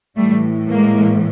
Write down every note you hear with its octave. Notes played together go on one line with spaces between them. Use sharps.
A2 E3 G3 A3
G#3 A#3